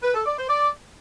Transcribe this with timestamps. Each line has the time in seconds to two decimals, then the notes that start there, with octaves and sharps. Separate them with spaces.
0.03 B4
0.14 A4
0.26 D5
0.37 C5
0.49 D5